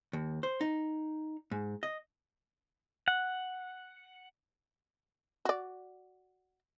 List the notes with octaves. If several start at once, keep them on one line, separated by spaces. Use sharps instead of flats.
D#2
C5
D#4
G#2
D#5
F#5
F#4 D5